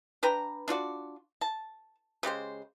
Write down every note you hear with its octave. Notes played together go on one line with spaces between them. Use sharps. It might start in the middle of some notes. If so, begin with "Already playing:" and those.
D4 B4 G5 A#5
D4 F4 F#4 D5
A5
C#3 G#3 G4 C5